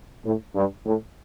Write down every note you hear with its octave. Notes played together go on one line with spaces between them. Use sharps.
A2
G2
A2